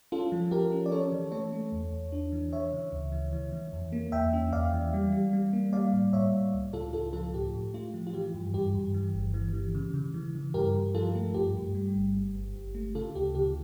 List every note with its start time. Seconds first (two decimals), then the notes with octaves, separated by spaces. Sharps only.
0.12 C#4 F4 A4
0.32 F3
0.51 F3 G4 A#4
0.72 C#4
0.86 D5
0.92 C#4 A4 C#5
1.12 E3
1.32 A3 A4 C#5
1.53 A3
1.72 E2
1.92 E2
2.12 D4
2.32 E3
2.53 E3 C#5 E5
2.72 C#3
2.92 D2
3.12 E3
3.33 E3
3.52 E3
3.73 F2
3.93 A#3
4.12 E2 E5 G5
4.33 C#4
4.53 E2 D5 F5
4.73 E3
4.94 G3
5.12 G3
5.33 G3
5.53 A#3
5.73 G3 D5 F5
5.93 A2
6.13 A2 C#5 E5
6.34 A2
6.54 C#2
6.73 C#3 F4 A4
6.93 C#2 F4 A4
7.13 F3 F4 A4
7.34 A2 G4
7.54 A2
7.74 A3 F4
7.94 F3
8.07 F4
8.14 E3 G4
8.34 G2
8.54 G2 G4
8.75 G2
8.94 E3
9.14 G1
9.34 E3
9.54 E3
9.75 C#3
9.94 C#3
10.14 E3
10.35 C#3
10.54 G2 G4 A#4
10.75 G2
10.94 F3 F4 A4
11.15 A3
11.34 G2 G4
11.54 G2
11.75 G3
11.96 G1
12.15 G1
12.35 G1
12.55 G1
12.75 A3
12.95 C#3 F4 A4
13.15 D2 G4
13.35 C#3 G4